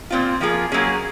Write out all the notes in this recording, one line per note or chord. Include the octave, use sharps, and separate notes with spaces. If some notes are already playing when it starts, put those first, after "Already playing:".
A#2 F#3 C4 F4
F3 A#3 F4 G#4
F#3 A#3 C#4 G#4